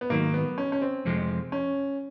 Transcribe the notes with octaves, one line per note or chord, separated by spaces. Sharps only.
B3
G#2 D#3 F#3 A#3
B3
C#4
C#4
C4
F2 C3 F3 G#3
C#4